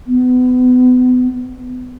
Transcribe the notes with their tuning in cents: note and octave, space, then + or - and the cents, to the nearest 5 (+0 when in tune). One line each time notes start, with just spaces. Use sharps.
B3 +30